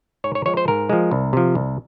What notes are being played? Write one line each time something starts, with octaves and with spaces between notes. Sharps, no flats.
G#2 C#5
C#5
F3 G#3 C#5
C5
G#2 A#4
F3 G#3
C2
C3 F3
C2